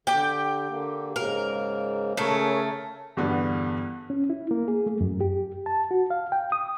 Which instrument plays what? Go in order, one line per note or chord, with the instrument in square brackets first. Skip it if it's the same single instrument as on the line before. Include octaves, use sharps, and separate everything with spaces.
[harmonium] D3 [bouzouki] G4 G5
[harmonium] D3 A#3
[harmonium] G#2 C#3 A#3 [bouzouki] A#4
[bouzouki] C#3 A3 [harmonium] A4 A#4 C#5
[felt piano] E2 G2 D3 B3 D4
[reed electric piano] C#4
E4
A#3
G#4
A3
F#2
G4
A5
F#4
F5
G5
D#6